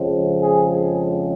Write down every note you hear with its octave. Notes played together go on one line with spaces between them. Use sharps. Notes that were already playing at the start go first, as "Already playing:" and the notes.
Already playing: F2 C#3 F3 G#3 C4
G#4